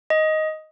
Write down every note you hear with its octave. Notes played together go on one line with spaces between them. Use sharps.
D#5